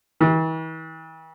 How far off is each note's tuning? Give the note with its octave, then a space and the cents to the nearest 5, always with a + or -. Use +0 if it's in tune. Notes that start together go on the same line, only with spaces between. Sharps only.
E3 -40